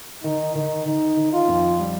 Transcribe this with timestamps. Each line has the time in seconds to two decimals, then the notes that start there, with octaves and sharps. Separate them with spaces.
0.23 D#3 D#4
0.55 D#3 D#4
0.86 D#3 D#4
1.17 D#3
1.33 F4
1.48 F2
1.79 G3